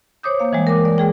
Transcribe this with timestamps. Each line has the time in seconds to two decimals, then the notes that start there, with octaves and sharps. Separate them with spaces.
0.23 C5 C#5 D6 D#6 G6
0.40 A#3 F5
0.53 E3 G3 G#3
0.67 A#4 D6
0.85 D5
0.98 G#3 G#4 G5